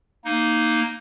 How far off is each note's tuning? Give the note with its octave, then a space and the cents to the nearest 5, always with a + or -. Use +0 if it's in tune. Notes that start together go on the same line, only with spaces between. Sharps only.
A#3 +0 D#4 +0